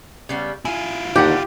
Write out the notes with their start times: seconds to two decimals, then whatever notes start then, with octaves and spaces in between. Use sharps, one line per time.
0.29 C#3 G3 B3
0.65 E4 F4 G#5
1.16 D#2 D3 G4 F#5